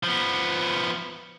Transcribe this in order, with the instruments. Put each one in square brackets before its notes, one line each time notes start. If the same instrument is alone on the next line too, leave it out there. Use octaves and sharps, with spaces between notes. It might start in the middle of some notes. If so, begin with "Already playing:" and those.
[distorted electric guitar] F3 B3